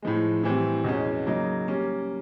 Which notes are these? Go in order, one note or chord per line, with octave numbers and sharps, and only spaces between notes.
A2 F3 G#3
A2 E3 G3 C4
E2 B2 G#3 C#4
C#3 F#3 A#3 D#4
G3 A#3 C#4